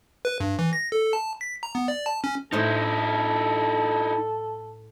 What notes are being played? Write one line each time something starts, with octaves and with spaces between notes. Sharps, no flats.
B4
G2
E3
A#6
A4
A5
B6
A#5
B3
D5
A5
C#4
A2 D#4 E4 A4 C5